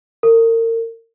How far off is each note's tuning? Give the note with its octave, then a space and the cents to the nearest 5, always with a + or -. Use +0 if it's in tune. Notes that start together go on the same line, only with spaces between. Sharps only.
A#4 -35